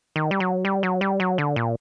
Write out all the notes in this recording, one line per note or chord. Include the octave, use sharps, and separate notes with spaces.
D#3
G3
F#3
G3
F#3
G3
F#3
D3
A#2